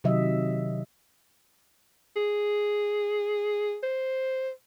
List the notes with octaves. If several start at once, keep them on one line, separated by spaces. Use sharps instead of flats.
C3 D#3 F#3 D#5 E5
G#4
C5